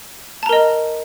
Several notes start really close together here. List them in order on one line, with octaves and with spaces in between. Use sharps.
A5 A#5 A#4 D#5